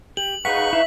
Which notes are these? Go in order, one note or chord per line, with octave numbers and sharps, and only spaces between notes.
G4 F#7
D#4 G#4 B4 F5 F#5 C#6 B6
E4 E5 F5